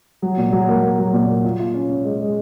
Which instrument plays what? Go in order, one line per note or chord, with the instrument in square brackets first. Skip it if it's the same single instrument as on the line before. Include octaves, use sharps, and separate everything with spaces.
[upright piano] F#3
A#2
F#3
A#3
A#3
F#3
A#2
A#3
F4
F4
C#4
C#4
G#3
G#3